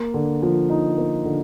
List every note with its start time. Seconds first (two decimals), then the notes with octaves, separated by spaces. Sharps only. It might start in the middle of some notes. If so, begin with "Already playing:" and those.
Already playing: A#3
0.14 D3
0.43 F3
0.70 D#4
0.98 A#3
1.25 D3